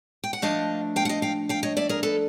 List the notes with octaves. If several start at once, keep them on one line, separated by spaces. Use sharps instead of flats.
G5
F#5
F3 A3 D4 D#5 F5
F5 G5
F#5
D#5 F5
F5 G5
F5 G5
C#5 D#5
D5 E5
G#4 A#4
A4 B4